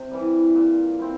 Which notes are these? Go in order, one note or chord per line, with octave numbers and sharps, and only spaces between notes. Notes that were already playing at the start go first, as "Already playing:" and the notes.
Already playing: C3
E3 G3
A#2
C4 E4